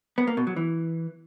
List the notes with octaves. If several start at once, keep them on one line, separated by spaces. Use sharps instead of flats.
B3
A#3
B2
F#3
E3